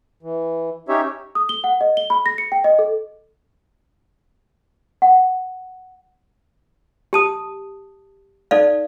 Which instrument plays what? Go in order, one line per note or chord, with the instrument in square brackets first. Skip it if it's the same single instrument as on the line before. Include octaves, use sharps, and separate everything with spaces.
[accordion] E3
C#4 D#4 G4 C#5 E5
[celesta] D#6
G7
F#5
D#5
G7
B5
A#6
C#7
G5
D#5
A4
[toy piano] F#5
G4 A5 D#6
D#4 A4 D5 F5